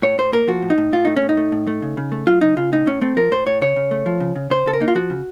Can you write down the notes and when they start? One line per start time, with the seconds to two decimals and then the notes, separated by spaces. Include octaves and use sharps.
0.02 A2 C#5
0.18 A2 C5
0.32 A#3 A#4
0.47 F3 F#4
0.62 A2
0.70 D#4
0.78 A2
0.92 A2 F4
1.05 A3 D#4
1.16 C#4
1.22 A2
1.29 D#4
1.37 A3
1.52 A2
1.67 A3
1.82 C#3
1.97 C#3
2.12 A3
2.27 F#3 F4
2.41 C#3 D#4
2.57 C#3 F4
2.72 A2 D#4
2.86 A2 C#4
3.01 A3 C4
3.17 F3 A#4
3.31 A2 C5
3.46 A2 C#5
3.62 C#3 C#5
3.76 C#3
3.91 A3
4.06 F3
4.20 C#3
4.36 C#3
4.50 C#3 C5
4.66 C#3 A4
4.73 A#4
4.80 A#3 D#4
4.88 F4
4.95 F3 F#4
5.10 C#3